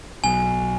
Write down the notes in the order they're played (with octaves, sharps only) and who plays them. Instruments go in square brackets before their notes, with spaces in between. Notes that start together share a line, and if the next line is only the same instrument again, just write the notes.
[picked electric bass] B1 B2 F#3 [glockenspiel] G#5